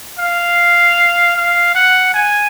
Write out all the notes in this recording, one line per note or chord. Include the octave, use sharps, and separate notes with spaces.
F5
F5
F#5
G#5